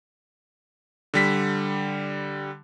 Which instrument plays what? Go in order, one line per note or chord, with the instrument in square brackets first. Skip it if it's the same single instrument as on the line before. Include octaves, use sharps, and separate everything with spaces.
[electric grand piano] D3 G3 B6